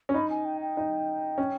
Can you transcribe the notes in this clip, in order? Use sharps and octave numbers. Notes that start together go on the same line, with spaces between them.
C#4
D#4 B5
G#5
G5
G5
D#4
C#4